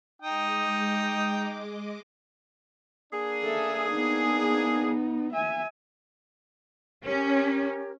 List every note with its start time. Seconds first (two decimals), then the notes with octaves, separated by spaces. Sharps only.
0.22 G#3 D#4 D#5 G5 D6 D#6
3.13 A#3 D4 G#4
3.44 A4 E5
3.91 B3 D#4
5.33 E5 G#5
7.05 C#4 G4 A#4 C#5